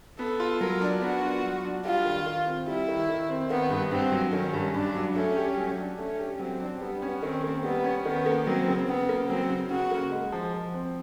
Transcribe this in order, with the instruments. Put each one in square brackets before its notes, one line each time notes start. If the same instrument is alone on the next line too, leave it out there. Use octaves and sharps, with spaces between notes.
[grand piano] B3 [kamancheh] A4
[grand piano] F4
[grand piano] F#3 [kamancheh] A#4
[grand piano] D4
[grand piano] B3 [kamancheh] F#4
[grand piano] F4
F#3
D4
[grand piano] G3 [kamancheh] F4
[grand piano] D#3
D#3
C4
[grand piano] G3 [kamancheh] E4
[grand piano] D#3
D#3
C4
[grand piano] D#3 [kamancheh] B3
[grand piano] G2
[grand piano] G2 [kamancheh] C4
[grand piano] F#3
[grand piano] D#3 [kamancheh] C#4
[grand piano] G2
[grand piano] G2 [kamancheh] D4
[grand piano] F#3
[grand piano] A3 [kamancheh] C#4
[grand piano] G4
F#3
D4
[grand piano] A3 [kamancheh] C#4
[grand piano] G4
[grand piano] F#3 [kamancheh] C4
[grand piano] D4
[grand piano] G3 [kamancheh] B3
[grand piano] C#4
[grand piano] D#3 [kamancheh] C4
[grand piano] A#3
[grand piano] G3 [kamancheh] B3
[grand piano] C#4
[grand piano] D#3 [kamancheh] B3
[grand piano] A#3
[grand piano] F#3 [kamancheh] C4
[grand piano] C#3
[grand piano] C#3 [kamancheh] B3
[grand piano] A#3
[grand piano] F#3 [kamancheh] C4
[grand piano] C#3
[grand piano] C#3 [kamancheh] F#4
[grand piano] A#3
G#3
F3
F3
C4